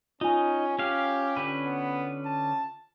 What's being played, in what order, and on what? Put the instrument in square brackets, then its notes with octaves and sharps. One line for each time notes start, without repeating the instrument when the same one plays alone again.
[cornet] C#4 [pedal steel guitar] D#4 [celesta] F4 G#5
[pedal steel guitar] C#4 F5 [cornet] G4
[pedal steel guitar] D3 C#4 B4
[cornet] B3
A5